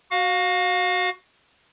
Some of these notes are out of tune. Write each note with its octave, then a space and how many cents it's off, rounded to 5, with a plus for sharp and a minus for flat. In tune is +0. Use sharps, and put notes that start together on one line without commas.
F#4 +0 F5 +35